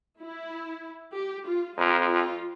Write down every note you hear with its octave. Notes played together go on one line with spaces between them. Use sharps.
E4
G4
F4
F2 F4
F4